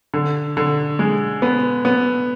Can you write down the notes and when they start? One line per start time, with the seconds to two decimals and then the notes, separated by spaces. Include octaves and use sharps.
0.14 D3
0.57 D3
0.99 G#3
1.42 B3
1.85 B3